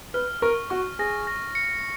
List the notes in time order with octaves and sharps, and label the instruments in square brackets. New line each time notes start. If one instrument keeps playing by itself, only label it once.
[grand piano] B4 [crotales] F6
[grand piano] A#4 [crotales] C#6
[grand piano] F#4 [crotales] C#6
[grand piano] G#4 [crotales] A#6
[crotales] A#6
C#7